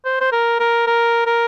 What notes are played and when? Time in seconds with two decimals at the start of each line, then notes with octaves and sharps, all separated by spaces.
0.05 C5
0.21 C5
0.33 A#4
0.60 A#4
0.87 A#4
1.26 A#4